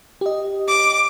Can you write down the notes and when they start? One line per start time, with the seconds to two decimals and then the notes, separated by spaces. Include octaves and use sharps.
0.21 G4 D#5
0.67 D6